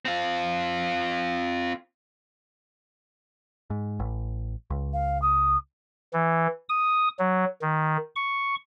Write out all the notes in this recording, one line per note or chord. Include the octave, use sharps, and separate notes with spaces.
C4 F4
G#2
A1
C#2
F5
D#6
E3
D#6
F#3
D#3
C#6